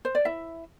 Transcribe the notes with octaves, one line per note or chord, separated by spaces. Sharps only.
C5
D5
E4 E5